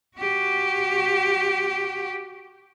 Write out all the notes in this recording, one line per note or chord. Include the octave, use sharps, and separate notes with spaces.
F#4 G4